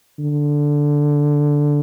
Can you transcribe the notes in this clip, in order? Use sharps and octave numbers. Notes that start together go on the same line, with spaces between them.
D3